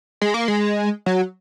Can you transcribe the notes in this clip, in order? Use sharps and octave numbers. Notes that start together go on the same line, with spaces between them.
G#3
A#3
G#3
F#3